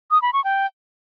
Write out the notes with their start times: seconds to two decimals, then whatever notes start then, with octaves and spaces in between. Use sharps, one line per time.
0.11 D#6
0.22 B5
0.33 C#6
0.44 G5